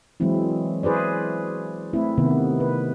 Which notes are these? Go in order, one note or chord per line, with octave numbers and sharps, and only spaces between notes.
E3 F#3 G#3 C4 E4
E4 G#4 B4 C5 D5
A3 C4 E4
C3 D#3 B3
B4